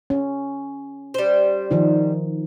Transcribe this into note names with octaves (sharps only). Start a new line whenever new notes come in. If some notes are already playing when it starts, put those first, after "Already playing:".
C#4
G3 C5
D#3 F3 D#4